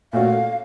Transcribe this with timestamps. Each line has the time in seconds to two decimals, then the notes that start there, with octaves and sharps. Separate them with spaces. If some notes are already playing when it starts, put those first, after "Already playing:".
0.13 A#2 A3 C#4 F#4 F5